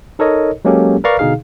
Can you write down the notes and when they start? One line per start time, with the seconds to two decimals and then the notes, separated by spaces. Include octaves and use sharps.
0.19 D#4 A4 A#4 C#5 D#5
0.65 F#3 G#3 A#3 C#4 G4 A4
1.04 A#4 B4 D5 F5 A#5 C#6
1.19 B2 D3 D#4 G#4 F5